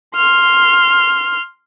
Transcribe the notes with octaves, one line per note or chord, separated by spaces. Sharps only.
C6 F6